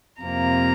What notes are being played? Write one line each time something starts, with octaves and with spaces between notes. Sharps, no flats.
F2 C3 F3 A#3 A#5